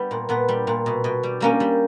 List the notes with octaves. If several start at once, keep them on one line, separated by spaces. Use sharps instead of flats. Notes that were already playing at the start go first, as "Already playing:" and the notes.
Already playing: G3 B3
A#2
A#2 B3
G3
A#2
B2
B2
G3
G3 A#3 C#4
G3